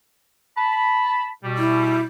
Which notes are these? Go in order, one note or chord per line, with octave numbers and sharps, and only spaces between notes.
A5 B5
B2 G3
E4